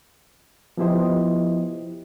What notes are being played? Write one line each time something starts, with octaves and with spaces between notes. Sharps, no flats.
F3 B3 E4 G4 C5 D#5